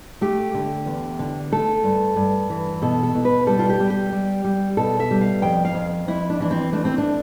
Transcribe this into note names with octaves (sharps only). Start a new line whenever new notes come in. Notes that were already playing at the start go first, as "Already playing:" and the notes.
A3 G4
D3
E2
D3
A3 A4
G2
G2
E3
B2 A4
A4
B2
B4
G3 A4
F4
G4
G3
G4
G3
G3
B2 A4
E5
G3
F5
F2 G5
F5
F2
F2 E4
D4
E3 D4
C4
A3 D4
C4
D4